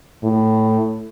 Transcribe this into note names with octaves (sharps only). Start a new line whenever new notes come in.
A2